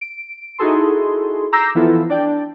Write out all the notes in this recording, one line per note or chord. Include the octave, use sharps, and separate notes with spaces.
D7
D#4 E4 F#4 G#4 A4 C6
A#5 D6 E6 G6 A#6 C7
E3 F3 B3 E4 F4 A4
D4 D5 G5